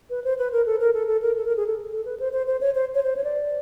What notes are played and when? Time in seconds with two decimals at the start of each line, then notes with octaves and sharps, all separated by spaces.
0.10 B4
0.24 C5
0.39 B4
0.52 A#4
0.66 A4
0.80 A#4
0.94 A4
1.07 A4
1.22 A#4
1.36 A4
1.46 A#4
1.57 G#4
1.67 A4
1.92 A4
2.05 B4
2.20 C5
2.33 C5
2.47 C5
2.61 C#5
2.75 C5
2.95 C#5
3.03 C5
3.17 C#5
3.24 D5